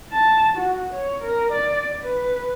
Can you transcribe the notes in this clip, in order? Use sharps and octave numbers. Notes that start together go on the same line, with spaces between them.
A5
F#4
C#5
A#4
D5
B4